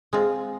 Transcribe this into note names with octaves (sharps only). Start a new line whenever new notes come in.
G#3 C4 F4